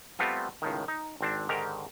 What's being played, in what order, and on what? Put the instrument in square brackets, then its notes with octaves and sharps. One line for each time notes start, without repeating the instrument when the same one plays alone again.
[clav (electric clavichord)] G3 A3 B3 C4 F4
C#2 A2 D#3
D#4
G#1 C4 D4
G#2 D3 D#3 G4 A#4 A#5